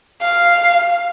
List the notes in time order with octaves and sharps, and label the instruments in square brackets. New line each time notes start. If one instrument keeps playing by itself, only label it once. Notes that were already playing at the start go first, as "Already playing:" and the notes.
[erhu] F5